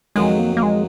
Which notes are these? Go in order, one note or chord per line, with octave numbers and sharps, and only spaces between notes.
F2 D#3 F#3 G#3
A#3
A#3
G#3